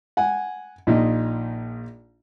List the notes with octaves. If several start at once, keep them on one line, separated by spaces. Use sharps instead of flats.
F#5 G#5
A#1 A#2 D#4